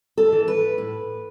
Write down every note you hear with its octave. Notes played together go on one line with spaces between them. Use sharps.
A4
E3
B4
A2